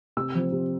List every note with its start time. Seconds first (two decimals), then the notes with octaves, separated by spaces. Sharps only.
0.17 C3 E6
0.35 F3 C4
0.52 C3